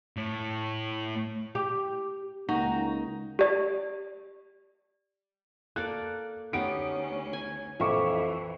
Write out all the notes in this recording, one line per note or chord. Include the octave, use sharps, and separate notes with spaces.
A2
G4
C#2 A#3 D#4 F#4 G5 A#5
G4 D5
A#3 A4 D5 F#6
D2 B3 C#4 D#4 G4 D7
G#5
A#1 F2 E3 E5 C#6 D6